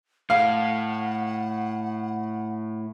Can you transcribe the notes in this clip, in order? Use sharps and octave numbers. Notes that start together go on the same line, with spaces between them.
A2 F5 F#5